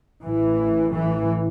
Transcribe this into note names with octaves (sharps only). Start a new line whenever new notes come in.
A1 A2 E3
E3